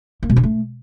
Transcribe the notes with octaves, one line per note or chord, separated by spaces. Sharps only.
A#3
B2
D3
A3